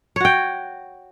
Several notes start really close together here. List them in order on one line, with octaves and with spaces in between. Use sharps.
C#5 F#4 G5